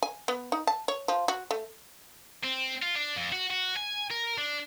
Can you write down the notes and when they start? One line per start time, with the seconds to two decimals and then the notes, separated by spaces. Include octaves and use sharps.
0.03 G#5
0.28 B3
0.52 D#4
0.67 A5
0.88 C#5
1.08 F3
1.28 F#4
1.51 A3
2.44 C4
2.82 F4
2.96 D4
3.16 F2
3.32 F#4
3.50 F#4
3.76 G#5
4.10 A#4
4.38 D4